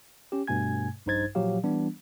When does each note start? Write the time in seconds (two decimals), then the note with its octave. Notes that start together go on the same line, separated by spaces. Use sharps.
0.32 C#4 G4
0.47 G2 B2 A3 G#5 G#6
1.06 A#1 G2 D#4 C5 G#6 A6
1.35 A#2 F3 F#3 G4 F5
1.63 E3 G3 B3 D4